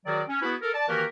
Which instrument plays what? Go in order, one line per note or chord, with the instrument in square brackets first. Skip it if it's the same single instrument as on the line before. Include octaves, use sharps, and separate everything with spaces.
[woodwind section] D#3 F#3 F#4 G#4 A#4 D5
C#4
B3 E4 F#4 G#4 B4
A4 A#4
D5 A5
D#3 E3 A#3 F#4 G4 A#4